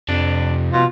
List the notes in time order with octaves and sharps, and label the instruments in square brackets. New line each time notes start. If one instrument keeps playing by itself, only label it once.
[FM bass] F2 [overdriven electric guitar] C3 F3 [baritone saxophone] D4
[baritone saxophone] B2 [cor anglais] F4